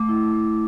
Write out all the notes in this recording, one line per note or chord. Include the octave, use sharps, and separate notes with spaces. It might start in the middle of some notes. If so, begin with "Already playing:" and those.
Already playing: A3 D6
E4
A3